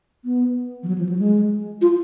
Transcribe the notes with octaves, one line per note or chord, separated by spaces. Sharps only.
B3
F3
F#3
F3
F#3
G#3
F4